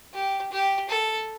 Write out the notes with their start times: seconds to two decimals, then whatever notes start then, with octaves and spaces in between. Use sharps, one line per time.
0.14 G4
0.52 G4
0.89 A4